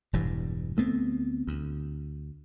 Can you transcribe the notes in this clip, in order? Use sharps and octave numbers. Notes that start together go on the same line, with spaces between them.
E1 G2 E3
D2 A3 B3 C4
D2